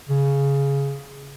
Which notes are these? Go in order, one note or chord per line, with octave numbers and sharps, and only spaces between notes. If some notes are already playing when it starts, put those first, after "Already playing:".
C#3